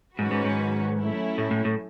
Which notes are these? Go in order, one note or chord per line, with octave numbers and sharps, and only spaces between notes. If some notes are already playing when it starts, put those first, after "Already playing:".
G#2 D#3 F#3 C#4 F#4 B4
G#2
G#2
F#3 A3 C#4 E4
A2
A2
A2